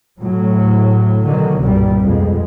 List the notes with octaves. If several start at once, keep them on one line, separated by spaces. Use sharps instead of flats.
A2 F#3
B2 D3 D#3 F#3
C2 G2 A#2 G3
F2 B2 G#3